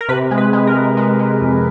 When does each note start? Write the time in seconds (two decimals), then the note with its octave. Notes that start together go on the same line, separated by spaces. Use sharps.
0.01 A#4
0.09 C3 B4
0.31 G#3
0.38 B4
0.53 G#3
0.67 A#4
0.75 G#3
0.97 G#3
1.19 G#3
1.41 F2